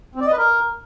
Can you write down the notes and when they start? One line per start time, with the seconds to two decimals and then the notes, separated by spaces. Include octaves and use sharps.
0.15 C4
0.21 D5
0.27 D#5
0.32 B4
0.38 A#4